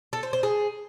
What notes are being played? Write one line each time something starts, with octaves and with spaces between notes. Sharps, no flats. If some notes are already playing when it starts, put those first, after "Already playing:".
A4
C5
C5
G#4